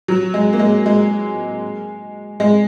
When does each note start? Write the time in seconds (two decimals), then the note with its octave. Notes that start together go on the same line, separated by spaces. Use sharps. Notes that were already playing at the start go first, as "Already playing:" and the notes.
0.08 F#3
0.34 G#3
0.53 A#3
0.59 G#3
0.86 G#3
2.40 G#3